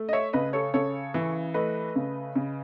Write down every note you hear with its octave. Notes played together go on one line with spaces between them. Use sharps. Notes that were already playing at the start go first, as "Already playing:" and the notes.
Already playing: A3
D#5
C#5 E5
C#3 B4 D#5
A4 C#5
C#3 A4 C#5
E3
A3 B4 D#5
C#3
C#3